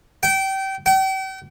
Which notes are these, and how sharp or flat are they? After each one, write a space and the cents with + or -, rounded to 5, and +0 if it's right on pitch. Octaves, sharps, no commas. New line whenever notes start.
G5 -25
G5 -40